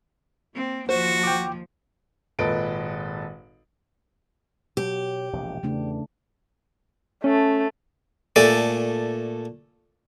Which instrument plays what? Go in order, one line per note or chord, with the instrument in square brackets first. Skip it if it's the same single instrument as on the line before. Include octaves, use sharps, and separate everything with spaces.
[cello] A#3 C4
[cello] D#2 F3 [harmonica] F#4 [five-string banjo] C5
[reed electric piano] G5 D6
[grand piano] G#1 A#2 A4 B4 D#5 D7
[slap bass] B2 F#3 [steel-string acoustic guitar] G4
[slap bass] E1 A#1 C3
[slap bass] E2 [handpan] C#3 A3 D4
[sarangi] A3 [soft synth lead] C#4
[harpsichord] A#2 A3 A4 D5 G#5